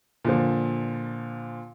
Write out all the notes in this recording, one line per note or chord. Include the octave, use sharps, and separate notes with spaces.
A#2 D3 F3